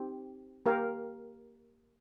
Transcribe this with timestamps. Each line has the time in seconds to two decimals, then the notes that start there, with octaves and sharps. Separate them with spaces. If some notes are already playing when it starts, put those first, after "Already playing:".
Already playing: C4 D#4 G4
0.66 A#3 G4 A#4 F5